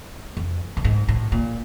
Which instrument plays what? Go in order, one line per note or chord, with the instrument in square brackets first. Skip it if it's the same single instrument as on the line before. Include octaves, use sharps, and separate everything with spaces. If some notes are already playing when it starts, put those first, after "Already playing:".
[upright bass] F2
A2
G#2
A2
A#2